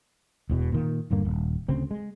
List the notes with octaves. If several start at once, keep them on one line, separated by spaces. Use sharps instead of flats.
E1 E2 B2
A#2 D#3 A#3
D#1 G2 D3 A#3
D#1
D2 C#3 C4
G#3